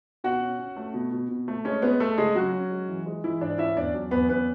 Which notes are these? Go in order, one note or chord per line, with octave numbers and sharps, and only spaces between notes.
B2 F#4 F#5
C#4
C#4
A3
B2
B2
B2
A3
G#3 C#4 C#5
G#3 B3 B4
G#3 A3 A4
C#3 G#3 G#4
F#3 C#4 F#4
C#4
G#3
E3
G#3
E3 E4
G#2 D4 D5
C#4 E4 E5
E2 D4 D5
F#3
E2 B3 B4
B3 C#4 B4